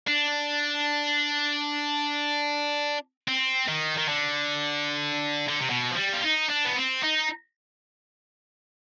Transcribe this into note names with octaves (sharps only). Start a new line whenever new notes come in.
D4
C4
D#3
D#3
D3
D3
C3
B2
F3
G3
F4
D#4
D4
B3
C4
D#4